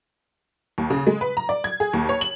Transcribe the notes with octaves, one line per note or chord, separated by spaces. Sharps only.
D#2
C#3
G#3
B4
A#5
D5
G#6
G#4
D#2
C#5
F#7